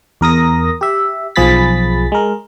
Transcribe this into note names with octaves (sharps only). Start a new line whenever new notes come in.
E2 A#4 D#6 A#6
G4 E5
B1 F3 G#4 B5 A6 B6
G#3 A#4